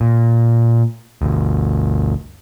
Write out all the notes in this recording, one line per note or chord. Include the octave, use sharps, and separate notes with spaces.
A#2
G1 D2